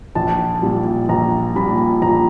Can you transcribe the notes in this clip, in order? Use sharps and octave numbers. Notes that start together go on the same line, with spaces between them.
A#1 A5
A#2 G3
A#1 A#5
A#2 G3 B5
A#1 A#5